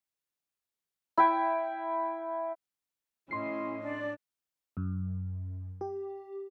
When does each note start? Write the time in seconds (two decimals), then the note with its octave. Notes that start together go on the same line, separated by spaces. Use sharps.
1.17 E4 E5 G5
3.31 A2 C#4 E4 D#5 C6 C7
3.84 D4 D5
4.77 F#2
5.81 G4